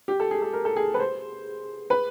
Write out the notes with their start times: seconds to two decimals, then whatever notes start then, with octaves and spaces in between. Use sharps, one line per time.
0.08 G4
0.20 A4
0.31 G#4
0.42 A4
0.53 A#4
0.65 A4
0.76 G#4
0.94 B4
1.00 C5
1.90 B4